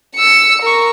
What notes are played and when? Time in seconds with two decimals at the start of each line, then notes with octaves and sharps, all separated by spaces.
0.16 E6 C#7
0.62 A#4 C#6